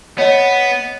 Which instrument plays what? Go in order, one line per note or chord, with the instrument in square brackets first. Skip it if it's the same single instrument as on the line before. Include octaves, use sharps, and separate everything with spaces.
[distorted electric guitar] B3 [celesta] C#5 D#5